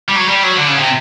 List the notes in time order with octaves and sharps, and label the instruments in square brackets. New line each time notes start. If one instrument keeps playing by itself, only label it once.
[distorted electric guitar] G3
F#3
G3
F#3
D3
C#3
C3